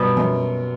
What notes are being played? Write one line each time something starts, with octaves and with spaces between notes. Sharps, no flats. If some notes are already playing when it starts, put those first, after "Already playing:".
Already playing: G2 B2
F#2